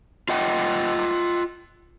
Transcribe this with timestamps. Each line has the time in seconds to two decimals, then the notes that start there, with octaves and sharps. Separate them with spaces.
0.29 F4 D#5 F#5 G5